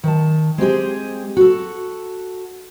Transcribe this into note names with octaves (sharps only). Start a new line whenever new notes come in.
D#3 A5
G#3 C4 G4 G#4
F#4 A4